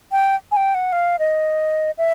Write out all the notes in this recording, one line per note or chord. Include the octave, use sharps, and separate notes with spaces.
G5
G#5
G5
F#5
F5
D#5
E5